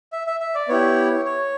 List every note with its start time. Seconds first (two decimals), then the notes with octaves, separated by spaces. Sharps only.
0.13 E5
0.27 E5
0.40 E5
0.55 D5
0.69 B3 E4 G4 C#5
1.25 C#5